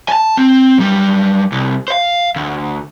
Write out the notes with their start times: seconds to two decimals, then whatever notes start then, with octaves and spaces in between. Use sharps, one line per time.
0.09 G#5 A5
0.37 C4
0.78 F#2 G3
1.52 C2
1.88 C5 F5
2.36 D2